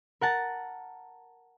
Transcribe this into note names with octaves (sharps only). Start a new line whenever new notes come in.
A#4 F#5 A5